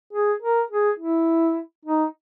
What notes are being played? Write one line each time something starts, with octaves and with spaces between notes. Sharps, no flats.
G#4
A#4
G#4
E4
D#4